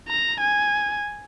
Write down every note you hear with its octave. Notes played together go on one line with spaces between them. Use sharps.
A#5
G#5